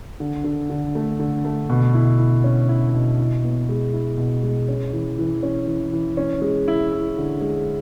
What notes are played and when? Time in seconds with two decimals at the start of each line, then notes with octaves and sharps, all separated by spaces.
0.20 D3
0.44 D3
0.70 D3
0.95 A3
1.19 D3
1.45 A3
1.69 B2
1.94 E4
2.19 E4
2.44 C#4
2.69 E4
2.94 B2
3.19 E4
3.44 B3
3.69 G#3
3.93 E4
4.18 B2
4.43 G#3
4.68 C#4
4.93 E3
5.18 E3
5.43 C#4
5.67 E3
5.93 E3
6.17 C#4
6.42 G#3
6.68 E4
6.92 E4
7.17 D3
7.41 G#3